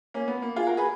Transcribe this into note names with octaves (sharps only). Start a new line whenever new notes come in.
A#3 C#4
B3
A#3
F4 G#4
F#4 A#4
G#4 B4